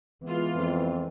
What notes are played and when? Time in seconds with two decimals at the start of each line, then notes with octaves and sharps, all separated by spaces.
0.24 E3 G#3 B3 F4
0.56 F2